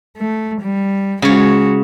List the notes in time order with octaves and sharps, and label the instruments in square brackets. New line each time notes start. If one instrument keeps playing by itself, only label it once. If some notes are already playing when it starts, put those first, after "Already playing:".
[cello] A3
G3
[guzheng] C#3 C#5 [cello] G#3 F#4